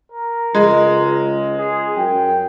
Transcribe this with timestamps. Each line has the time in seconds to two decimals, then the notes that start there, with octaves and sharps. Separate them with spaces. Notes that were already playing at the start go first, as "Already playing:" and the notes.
0.12 A#4
0.55 C#2 G#3
1.58 G#4
1.97 F#2 G5